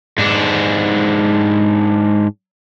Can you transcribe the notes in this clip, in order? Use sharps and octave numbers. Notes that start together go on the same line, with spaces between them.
G#2 D4